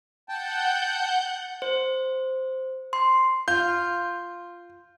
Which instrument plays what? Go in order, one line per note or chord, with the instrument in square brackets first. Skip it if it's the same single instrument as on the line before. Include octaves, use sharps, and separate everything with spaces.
[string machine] F#5 G6 [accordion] G5 A5
[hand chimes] C5
C6
[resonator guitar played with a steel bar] F4 [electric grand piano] G6